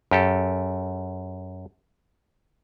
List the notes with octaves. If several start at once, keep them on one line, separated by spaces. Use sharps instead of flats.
F#2 G4 A4